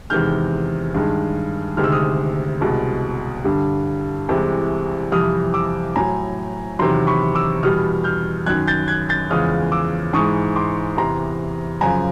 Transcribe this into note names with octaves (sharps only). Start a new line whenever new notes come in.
E2 C3 D#3 G#3 F6 G6
G2 D#3 G#3
D2 C3 D#3 G#3 F6
E6
D#6 F6
C2 B2 G#3
G2 D3 G3
C2 C3 E3 G#3
F2 C3 E3 G3 D#6 F6
D6 E6
A2 F#3 G#5 A#5
E2 C3 D#3 F#3 A#5 C6
B5 C#6
D6 E6
E2 B2 G3 D#6 F6
F6 G6
F#2 D#3 F#3 F#6 G#6
G6 A6
F#6 G#6
G6 A6
E2 C#3 F3 G#3 D#6 F6
D6 E6
G#2 E3 G#3 C#6 D#6
C6 D6
E2 C3 E3 A#5 C6
F#2 C#3 F3 G#5 A#5